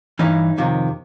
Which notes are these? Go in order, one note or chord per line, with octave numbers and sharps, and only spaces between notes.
G2 E3 C#4 D#4
F2 C3 D#3